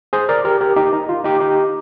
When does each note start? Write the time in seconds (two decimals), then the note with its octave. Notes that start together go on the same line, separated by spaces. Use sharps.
0.13 G#4 C5
0.29 A#4 D5
0.45 G4 A#4
0.61 G4 A#4
0.76 D#4 G4
0.93 D#4
1.09 F4
1.24 D#4 G4
1.41 D#4 G4